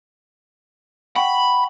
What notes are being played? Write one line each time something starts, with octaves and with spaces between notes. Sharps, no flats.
F#5 G5 B5 C#6